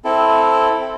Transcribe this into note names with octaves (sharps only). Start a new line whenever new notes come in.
C4 E4 A4